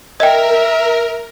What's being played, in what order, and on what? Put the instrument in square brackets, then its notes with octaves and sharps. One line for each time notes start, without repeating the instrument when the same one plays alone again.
[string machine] A#4 [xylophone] D#5 G5 [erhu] E5